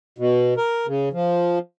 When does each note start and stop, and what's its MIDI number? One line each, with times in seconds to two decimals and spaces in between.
0.18 0.54 47
0.57 0.86 70
0.87 1.09 49
1.13 1.59 53